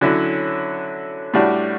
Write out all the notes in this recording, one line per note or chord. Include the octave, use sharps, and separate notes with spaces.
D3 F#3 C#4 E4
A2 G3 D4 F#4